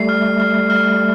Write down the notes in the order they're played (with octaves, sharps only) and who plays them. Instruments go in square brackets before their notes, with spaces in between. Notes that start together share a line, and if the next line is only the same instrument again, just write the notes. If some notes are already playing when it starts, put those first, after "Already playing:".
Already playing: [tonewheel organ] G3 A3 [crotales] C7
[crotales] F6
F6
F6